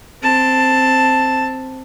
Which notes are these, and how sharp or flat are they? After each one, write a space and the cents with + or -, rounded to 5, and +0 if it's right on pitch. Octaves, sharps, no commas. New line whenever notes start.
C4 +0 A5 +5